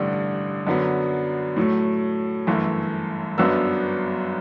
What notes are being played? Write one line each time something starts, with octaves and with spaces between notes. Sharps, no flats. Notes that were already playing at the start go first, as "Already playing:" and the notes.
Already playing: A1 G2 D3
F#2 D3 F#3 B3
A2 F#3 A3
G1 F#2 E3 A3
G1 F#2 F#3 B3 D4 E6